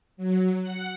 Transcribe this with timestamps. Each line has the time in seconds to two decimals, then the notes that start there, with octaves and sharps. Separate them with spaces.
0.17 F#3
0.62 F#5